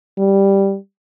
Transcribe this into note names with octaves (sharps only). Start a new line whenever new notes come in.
G3